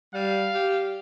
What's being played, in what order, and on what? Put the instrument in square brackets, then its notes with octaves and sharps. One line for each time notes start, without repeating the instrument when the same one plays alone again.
[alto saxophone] G3 [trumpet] F5
[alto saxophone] G4